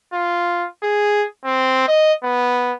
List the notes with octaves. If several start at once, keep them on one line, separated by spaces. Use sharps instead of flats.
F4
G#4
C4
D#5
B3